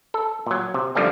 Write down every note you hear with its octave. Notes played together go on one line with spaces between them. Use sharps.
A4
A#2 F#3
C3
F#2 D3 F3 G3 A3 C4